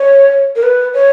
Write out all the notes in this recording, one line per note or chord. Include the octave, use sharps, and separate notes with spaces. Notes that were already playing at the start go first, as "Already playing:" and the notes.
Already playing: C#5
A#4
B4
C#5